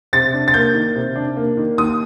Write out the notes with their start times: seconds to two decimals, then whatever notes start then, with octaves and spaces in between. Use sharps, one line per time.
0.13 C3 A6
0.34 D4
0.48 A6
0.54 A#3 G6
0.75 D#3
0.96 C3
1.16 D4
1.37 A#3
1.57 D#3
1.78 D#2 D#6